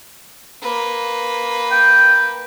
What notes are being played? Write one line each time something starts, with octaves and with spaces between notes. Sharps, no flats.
A#3 B4
G5